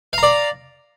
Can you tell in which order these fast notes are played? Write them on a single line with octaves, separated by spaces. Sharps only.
F5 A#5 D5